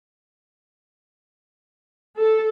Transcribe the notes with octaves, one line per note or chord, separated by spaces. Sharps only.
A4